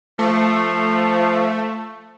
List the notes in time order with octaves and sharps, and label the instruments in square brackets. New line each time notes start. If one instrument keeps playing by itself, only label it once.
[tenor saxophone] F3 [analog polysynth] A3